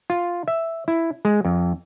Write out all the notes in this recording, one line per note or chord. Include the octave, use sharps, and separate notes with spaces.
F4
E5
E4
G#3
F2